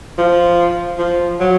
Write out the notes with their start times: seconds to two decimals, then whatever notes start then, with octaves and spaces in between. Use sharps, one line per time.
0.18 F3
0.99 F3
1.40 F#3